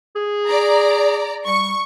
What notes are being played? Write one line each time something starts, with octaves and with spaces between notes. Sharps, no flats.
G#4
D5 A#5
G3 C#6